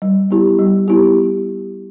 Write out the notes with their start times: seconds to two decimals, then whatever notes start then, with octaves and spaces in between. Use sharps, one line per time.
0.02 G3
0.31 B3 E4 G4
0.59 G3
0.88 B3 E4 G4